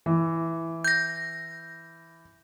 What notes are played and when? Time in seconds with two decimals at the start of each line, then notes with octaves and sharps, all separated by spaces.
0.06 E3
0.85 G6 A#6